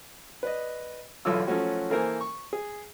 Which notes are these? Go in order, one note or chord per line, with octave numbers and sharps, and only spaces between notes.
B4 D5 D#5
B1 E2 D3 F4 E6
F3 F#3 A3 C#4 F#4
E3 A#3 A4 A#4 C5 G#5
C#6
G#4